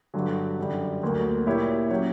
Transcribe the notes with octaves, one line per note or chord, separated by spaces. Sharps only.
G2 D3 F#3
F#2 D3 G3
D2 D3 F#3 A#3
A#2 A#3 E4 G4 C#5
F#3 C#4 G4 C#5